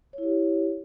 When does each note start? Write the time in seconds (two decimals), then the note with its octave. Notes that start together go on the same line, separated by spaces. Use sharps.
0.13 C#5
0.18 E4
0.23 G4